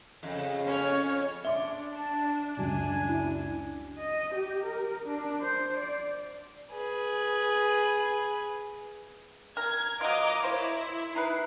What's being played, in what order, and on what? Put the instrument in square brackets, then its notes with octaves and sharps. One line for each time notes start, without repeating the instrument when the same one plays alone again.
[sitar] F2 [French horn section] C#3
[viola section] C#4 C#5
[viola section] D4 [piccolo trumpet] D5 [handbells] E5 C6 D6 [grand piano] C#7 G7
[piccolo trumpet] A5
[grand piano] C#2 F#2 C#3 [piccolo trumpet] G#5
[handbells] E4
[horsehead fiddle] D#5
G4
A#4
D4
C5
D5
[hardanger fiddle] G#4 B4
[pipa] A#4 [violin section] G#6
[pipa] F#3 F4 [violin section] D#5 A#5 D6
[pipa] A#3 C5 C#5 [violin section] E4
[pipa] D#4 E4 B4 [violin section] C7